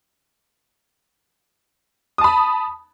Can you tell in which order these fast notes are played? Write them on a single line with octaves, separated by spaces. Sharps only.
D#6 A5 B5